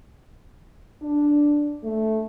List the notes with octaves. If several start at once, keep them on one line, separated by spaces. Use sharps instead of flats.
D4
A3